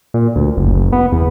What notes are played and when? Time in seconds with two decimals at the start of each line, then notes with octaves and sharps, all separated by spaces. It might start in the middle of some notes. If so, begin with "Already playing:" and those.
0.14 A#2
0.36 D2
0.57 F#1
0.75 F#1
0.92 B3
1.12 E2